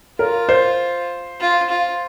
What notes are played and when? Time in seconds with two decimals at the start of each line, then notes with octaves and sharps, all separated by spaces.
0.19 F4 A#4
0.49 C5
1.40 F4
1.70 F4